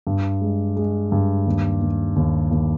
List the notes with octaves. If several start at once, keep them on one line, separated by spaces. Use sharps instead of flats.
G2
G#3
G#3
G2
D#2
D#2
D#2
D#2